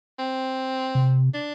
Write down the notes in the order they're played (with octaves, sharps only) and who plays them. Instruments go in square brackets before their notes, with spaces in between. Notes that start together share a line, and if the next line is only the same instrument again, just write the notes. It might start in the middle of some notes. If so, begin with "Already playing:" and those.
[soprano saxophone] C4
[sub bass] C3
[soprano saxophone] D4